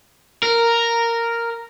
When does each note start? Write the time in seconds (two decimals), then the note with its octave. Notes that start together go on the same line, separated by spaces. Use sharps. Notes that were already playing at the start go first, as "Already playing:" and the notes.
0.43 A#4